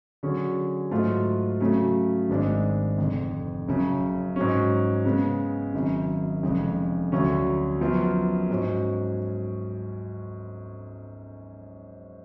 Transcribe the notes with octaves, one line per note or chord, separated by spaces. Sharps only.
D3 F#3 C#4 G#4
G#2 F#3 A3 F4
C#3 F#3 A3
G#1 G#2 G#3 D4
F1 F2 D3
F#1 F#2 C#3
G#2 F#3 C#4
C#3 G#3 B3
G#1 F#2 C#3
F1 F2 C#3 G#3
D2 D3 F#3 C#4
F#2 F3 B3 F4
G#2 F#3 C#4